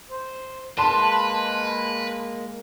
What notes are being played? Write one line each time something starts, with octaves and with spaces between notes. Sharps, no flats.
C5
G#3 A#3 B4 A5 C6